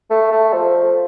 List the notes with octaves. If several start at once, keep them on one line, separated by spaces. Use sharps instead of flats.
A3
A3
F3